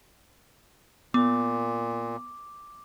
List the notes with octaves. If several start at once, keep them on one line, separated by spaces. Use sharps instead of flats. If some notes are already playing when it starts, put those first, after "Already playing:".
A#2 B3 D6